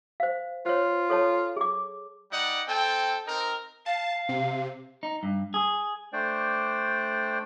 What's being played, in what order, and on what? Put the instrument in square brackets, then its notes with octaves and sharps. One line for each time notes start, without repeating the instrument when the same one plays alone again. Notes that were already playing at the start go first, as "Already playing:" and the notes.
[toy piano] C5 F5
[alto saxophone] F4 [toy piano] C5 C#5
[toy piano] A4 C#5 A5
G#4 D6
[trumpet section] G3 D#4 D5 F#5
C4 A4 G5
C4 D#4 A#4
[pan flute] F5 [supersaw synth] A5
[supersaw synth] C3
[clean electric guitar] D#4
G2
G#4
[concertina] A3 D4 C5 D5 G5